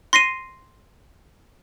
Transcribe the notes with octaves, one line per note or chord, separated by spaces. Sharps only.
C6 A#6 C7 D#7